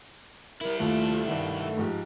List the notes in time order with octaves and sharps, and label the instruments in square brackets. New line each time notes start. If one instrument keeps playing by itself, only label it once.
[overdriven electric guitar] G3 E4 [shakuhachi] A#4
[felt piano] D#2 [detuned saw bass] A3 [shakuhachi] F4
[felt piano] G2 D#3 [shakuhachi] F#5
[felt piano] G#2 F3 G4